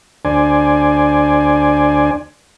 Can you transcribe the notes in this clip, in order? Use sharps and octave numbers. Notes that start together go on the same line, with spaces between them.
D2 D4 C5 D5 G#5